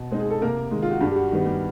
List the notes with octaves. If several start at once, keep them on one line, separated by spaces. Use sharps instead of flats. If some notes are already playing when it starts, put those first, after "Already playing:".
Already playing: B2
G#3 C4 D#4
G#4
A4
C3 A#3 A#4
D#3 G#3
F4
F#4
G2 G3 G4
G4
F#4
D#3 G3 B3
G3 G4